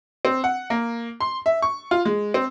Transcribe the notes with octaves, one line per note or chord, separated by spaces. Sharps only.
C4
F#5
A#3
C6
E5
C#6
F4
G#3
C4